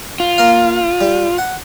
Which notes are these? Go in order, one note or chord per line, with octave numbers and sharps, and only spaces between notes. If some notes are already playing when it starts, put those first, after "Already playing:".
F4
A#3 F5
G3
F#5